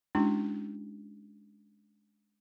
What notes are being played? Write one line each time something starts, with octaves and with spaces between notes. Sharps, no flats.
G#3 C#4 D4 E4 F#4